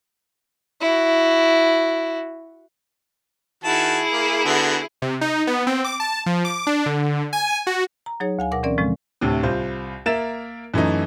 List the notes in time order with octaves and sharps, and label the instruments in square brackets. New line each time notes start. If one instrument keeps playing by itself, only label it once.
[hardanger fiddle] E4 F#4
[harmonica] D#3 F#4 A5 [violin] E4 G#4
[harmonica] A#3
D3 B3 F#4
[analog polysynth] C3
D#4
B3
C4
D6
A5
F3
D6
D4
D3
G#5
F#4
[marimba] A#5
F#3 D#4 G#4 C#5
D2 F5 G#5
B2 A#4 F#5 D6 A#6
E3 C4 C#4 A#4 D5
A2 C#3 F3 G#3 C4
[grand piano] D2 A2 C3
C2 F4 C5
A#3 A#4 E5 A6 E7
F#2 E3 A3 D#4